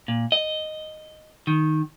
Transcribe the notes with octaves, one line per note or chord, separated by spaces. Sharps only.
A#2
D#5
D#3